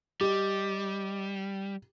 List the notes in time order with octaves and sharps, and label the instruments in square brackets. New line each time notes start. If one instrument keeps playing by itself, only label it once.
[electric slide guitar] G3 [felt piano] G4 [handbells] D#5 D6